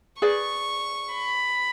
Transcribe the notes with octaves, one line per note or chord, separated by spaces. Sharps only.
G#4 B4 D5 C#6
B5